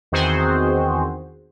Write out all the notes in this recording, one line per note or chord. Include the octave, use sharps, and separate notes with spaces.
E2 D#3 C4 F#4 G#4 C5